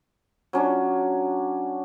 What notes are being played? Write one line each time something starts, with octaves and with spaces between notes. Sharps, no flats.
F#3 C#4 D4